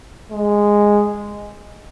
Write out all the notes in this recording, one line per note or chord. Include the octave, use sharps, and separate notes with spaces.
G#3